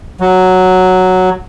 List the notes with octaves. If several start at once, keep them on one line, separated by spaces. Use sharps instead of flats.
F#3